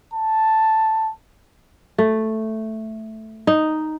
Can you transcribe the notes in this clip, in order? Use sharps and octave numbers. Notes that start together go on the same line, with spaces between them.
A5
A3
D#4